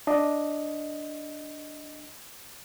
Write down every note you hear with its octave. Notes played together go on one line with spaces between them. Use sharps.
D4 D#5